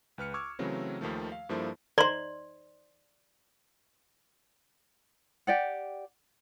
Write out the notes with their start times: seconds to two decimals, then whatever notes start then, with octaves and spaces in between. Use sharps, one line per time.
0.18 C#2 B4 F6 C#7
0.34 C#6 D6 E6 F6 G#6
0.59 C#3 E3 F#3 A3 C4
1.01 D#2 D#3 F3 A3
1.32 F5
1.49 G2 F3 A#3 E4 A4 C5
1.98 D#4 C5 D5 C6
5.47 G4 D5 F#5